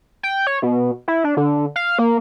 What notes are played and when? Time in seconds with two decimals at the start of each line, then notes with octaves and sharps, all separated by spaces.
0.23 G5
0.47 C#5
0.62 B2
1.08 E4
1.24 D4
1.37 D3
1.76 F5
1.99 A#3